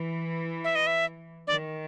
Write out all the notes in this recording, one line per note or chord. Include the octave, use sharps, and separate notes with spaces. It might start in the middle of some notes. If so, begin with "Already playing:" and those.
Already playing: E3
E5
D#5
E5
D#3 D5